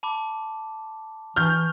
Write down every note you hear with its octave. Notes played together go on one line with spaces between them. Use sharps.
A5 B5 D6
E3 C#6 F6 G6